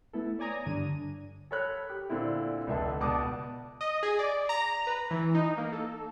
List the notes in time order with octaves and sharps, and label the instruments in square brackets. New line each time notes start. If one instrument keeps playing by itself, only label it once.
[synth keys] A3 B3 E4 A4
C#5 D5 G#5 A#5 D#6
G2 D3 D4 D#7
[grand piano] A4 A#4 C#5 B5 F#6
G4
A#2 D3 C4 E4
F1 C#2 D3 A3 E5 A5
C#2 B2 D5 A5 D6 D#6
[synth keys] D#5
G#4
D5
A#5
B4
E3
D#4
A#3
A4